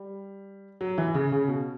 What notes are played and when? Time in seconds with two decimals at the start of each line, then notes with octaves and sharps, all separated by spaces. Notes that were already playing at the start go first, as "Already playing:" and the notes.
Already playing: G3
0.81 F#3
0.98 E3
1.14 C#3
1.32 C#3
1.48 B2